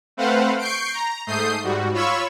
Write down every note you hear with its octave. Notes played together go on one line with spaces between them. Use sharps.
A3 C4 B4 C5 F5 F#5
C#6 G6 C7 D7
A#5
G#2 A3 D#6 G6 C7
G#2 G3 F#4
F4 C#5 B5 C#6 E6